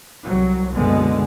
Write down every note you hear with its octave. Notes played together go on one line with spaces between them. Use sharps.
C2 F#3
F#1 B2 D3 G#3 B3